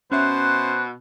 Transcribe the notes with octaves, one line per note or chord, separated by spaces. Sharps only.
B2 C#4 C5 E5 F#6